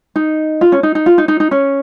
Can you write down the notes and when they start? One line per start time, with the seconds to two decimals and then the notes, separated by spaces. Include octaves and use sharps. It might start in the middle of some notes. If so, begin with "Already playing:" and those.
0.16 D#4
0.61 F4
0.72 C#4
0.83 D#4
0.95 D#4
1.06 F4
1.18 D#4
1.28 D#4
1.40 D#4
1.51 C#4